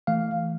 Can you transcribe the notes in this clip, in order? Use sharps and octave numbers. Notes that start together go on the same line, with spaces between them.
E3 A3 F5